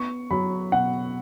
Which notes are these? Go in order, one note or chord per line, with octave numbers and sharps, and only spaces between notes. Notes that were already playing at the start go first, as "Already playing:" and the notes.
Already playing: B3 C#6
F#3 B5
B2 F#5